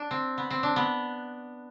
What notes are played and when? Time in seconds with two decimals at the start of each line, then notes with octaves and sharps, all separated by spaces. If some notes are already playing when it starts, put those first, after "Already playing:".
Already playing: D4
0.11 C4
0.38 B3
0.50 C4
0.63 D4
0.76 B3